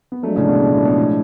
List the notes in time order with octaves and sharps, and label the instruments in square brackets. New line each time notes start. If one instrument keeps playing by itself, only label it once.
[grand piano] B3
[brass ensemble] F3 G#3 D4 [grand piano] F#3 A3
[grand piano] A2 C#3
B2
B2
A2
B2
A2